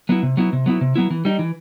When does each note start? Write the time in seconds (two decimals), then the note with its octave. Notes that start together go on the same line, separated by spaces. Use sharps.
0.09 F#3 B3 E4
0.23 C3
0.37 F#3 B3 E4
0.53 C3
0.66 F#3 B3 E4
0.81 C3
0.96 F#3 B3 E4
1.10 E3
1.25 G3 D#4
1.39 E3